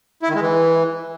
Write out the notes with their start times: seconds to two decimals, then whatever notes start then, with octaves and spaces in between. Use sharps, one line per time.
0.23 E4
0.29 D#3
0.35 G#3
0.41 E3